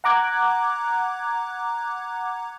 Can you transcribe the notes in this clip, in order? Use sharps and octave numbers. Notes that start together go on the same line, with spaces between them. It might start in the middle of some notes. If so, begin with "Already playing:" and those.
F#5 A#5 D6 F#6 G#6